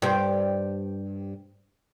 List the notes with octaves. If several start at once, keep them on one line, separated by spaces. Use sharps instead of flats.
G2 G4 C5